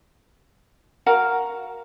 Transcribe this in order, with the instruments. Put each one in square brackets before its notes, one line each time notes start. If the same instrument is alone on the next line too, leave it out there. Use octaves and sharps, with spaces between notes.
[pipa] F#4 A#4 F5